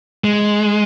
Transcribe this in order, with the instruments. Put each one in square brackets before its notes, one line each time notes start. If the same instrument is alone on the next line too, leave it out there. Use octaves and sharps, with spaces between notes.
[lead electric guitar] G#3